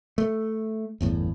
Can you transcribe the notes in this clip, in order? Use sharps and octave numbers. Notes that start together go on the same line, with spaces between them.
A3
G1 E2 A2